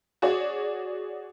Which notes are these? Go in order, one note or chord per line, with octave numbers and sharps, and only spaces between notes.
F#4 G#4 C#5 D5